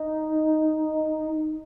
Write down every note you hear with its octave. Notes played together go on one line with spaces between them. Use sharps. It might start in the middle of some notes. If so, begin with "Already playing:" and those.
Already playing: D#4